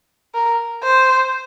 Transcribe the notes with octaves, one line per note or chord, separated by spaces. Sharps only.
A#4
C5